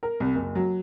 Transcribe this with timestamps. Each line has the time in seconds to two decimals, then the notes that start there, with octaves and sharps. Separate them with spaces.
0.03 A#4
0.20 C2
0.35 F#1
0.55 F#3